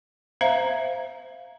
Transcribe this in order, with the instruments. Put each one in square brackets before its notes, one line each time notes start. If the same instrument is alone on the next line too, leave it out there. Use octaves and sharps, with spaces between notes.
[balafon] C5 E5 F5 A#5